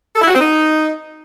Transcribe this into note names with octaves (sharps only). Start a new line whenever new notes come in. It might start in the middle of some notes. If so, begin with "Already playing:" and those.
A4
E4
F#4
C4
D#4